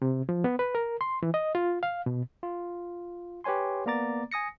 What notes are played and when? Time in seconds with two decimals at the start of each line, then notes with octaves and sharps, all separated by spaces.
0.02 C3
0.29 F3
0.44 B3
0.59 B4
0.75 A#4
1.01 C6
1.23 E3
1.34 D#5
1.55 F4
1.83 F5
2.06 B2
2.43 F4
3.44 G4 B4 C#5 G#5 C6
3.86 A#3 B3 D5 A#5 D6 A6
4.32 G#5 D#6 A#6 C#7